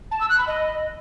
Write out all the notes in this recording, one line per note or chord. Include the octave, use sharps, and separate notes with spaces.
A5
E6
F#6
B5
D#5